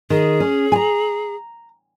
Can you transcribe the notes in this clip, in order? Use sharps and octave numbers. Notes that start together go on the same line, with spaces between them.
D#3 G#4
C#4
G#5 A#5